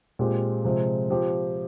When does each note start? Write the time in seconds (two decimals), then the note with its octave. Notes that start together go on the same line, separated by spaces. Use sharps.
0.19 A#2 G#3 C4 G4
0.65 C3 F3 G#3 C4
1.10 F3 C4 G4